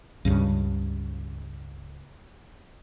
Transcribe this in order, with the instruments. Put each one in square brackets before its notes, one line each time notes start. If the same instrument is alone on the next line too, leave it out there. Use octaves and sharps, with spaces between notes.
[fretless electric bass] C#2 G2 C#3